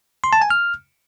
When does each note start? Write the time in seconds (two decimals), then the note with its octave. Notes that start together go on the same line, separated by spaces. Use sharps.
0.24 C6
0.33 A5
0.42 G#5
0.50 F6